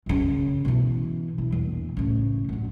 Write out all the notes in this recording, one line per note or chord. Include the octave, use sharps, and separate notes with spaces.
F#2 C#3
B2 E3
E4
A#1 E2
A2 C#3
F#2 D3